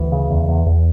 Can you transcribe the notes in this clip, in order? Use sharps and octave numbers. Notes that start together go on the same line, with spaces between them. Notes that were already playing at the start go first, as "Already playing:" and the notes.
Already playing: D2 E3
C#3
E2
E2
E2